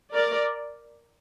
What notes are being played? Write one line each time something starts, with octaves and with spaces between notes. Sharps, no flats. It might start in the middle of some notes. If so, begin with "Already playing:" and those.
A#4 D5